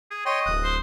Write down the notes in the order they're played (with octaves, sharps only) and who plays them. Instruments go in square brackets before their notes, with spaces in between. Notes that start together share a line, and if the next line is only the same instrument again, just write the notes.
[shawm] G#4
[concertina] C#5 G5 C6 [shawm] D#5
[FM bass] D1 [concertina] D#6 F#6
[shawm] C5